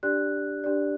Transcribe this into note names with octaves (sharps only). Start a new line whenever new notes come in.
D4 G4 D5 F#6
D4 G4 D5